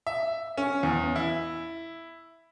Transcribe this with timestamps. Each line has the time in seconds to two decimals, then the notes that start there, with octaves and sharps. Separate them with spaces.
0.07 E5
0.57 C#4
0.83 E2
1.16 E4